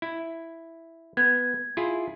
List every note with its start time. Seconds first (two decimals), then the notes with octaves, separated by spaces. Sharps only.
0.02 E4
1.17 B3 G#6
1.77 E4 F4 G#4